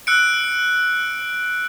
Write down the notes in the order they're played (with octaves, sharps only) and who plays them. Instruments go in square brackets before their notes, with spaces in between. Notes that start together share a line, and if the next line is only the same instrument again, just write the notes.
[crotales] E6 F#6 C#7 D7